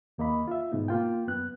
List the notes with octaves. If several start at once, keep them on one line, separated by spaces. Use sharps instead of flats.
D#2 A#3 D#5 B5
F4 E5
G#2 B2 B3 D#4
A#3 F4 G5
F#2 B3 F#6